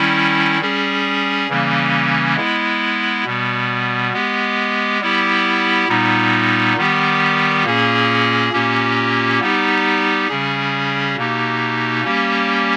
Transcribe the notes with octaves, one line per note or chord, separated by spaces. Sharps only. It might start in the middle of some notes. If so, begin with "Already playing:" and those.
Already playing: D#3 G3 C#4 E4
G3 C#4 G#4
C#3 E3 G3 A#3 C#4
G#3 B3 E4
B2 G3 B3
G#3 B3 G4
G3 B3 E4 G4
A#2 G3 B3 D#4
D#3 G3 B3 G4
A#2 A#3 C#4 G#4
A#2 A#3 C#4 G4
G3 B3 D#4 G4
C#3 G3 C#4 G#4
B2 A#3 D#4 G4
G3 A#3 C#4 G4